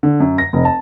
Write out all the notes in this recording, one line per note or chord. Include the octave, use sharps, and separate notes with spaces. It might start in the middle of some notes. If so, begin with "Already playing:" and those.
D3
F#2
A#6
F1
A5